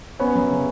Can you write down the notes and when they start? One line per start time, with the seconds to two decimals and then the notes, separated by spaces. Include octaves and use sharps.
0.20 B3 C#4 C#5
0.35 F#2
0.50 C#3